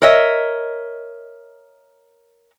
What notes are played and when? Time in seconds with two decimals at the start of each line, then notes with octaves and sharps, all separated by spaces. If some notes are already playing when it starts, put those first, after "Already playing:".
0.02 A#4 C#5 D#5 E5